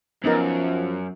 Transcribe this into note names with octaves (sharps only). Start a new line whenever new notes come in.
F#2 F3 B3 D#4 A#4